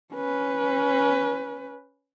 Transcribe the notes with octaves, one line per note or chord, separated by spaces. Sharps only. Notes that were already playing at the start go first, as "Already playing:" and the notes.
C#4 B4